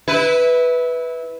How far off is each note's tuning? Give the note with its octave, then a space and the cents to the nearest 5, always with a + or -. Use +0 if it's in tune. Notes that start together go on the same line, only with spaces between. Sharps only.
E4 -20 B4 +0